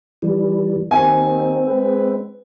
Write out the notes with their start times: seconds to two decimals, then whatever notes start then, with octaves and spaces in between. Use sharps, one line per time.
0.22 E3 G3
0.91 D#2 D#3 C4 G#5
1.66 G#3 B4